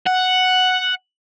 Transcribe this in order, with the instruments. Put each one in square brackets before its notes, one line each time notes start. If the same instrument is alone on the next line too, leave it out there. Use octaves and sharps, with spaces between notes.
[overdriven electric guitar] F#5